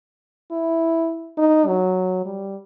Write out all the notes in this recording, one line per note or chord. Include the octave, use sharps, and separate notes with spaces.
E4
D#4
F#3
G3